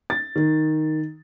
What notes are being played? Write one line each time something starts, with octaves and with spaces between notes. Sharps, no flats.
A6
D#3